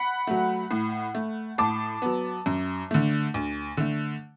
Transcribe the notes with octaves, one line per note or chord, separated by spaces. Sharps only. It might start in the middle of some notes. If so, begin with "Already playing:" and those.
Already playing: F#5 B5
F#3 A3
A2
A3
A2 A5 D6
F#3 B3
F#2
D3 A3
D2
D3 A3